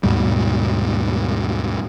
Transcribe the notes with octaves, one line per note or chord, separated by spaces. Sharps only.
D#2 G#2 B2 G3